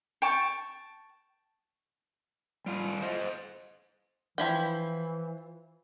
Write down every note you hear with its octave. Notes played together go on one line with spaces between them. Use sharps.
G5 A5 C#6
G3 F4
C5 D#5
E3 F3 E4 G5